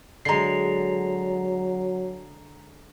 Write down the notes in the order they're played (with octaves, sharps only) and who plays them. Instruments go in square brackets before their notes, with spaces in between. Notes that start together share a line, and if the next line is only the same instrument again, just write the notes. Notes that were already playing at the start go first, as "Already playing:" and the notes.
[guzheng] D3 G#3 [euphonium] F#3 [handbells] A#5 C7